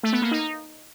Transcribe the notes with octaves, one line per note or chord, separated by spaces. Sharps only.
A3
B3
A#3
D#4